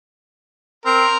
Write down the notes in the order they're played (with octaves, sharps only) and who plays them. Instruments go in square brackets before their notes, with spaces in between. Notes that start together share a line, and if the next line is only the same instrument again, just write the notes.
[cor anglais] C4 [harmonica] A#4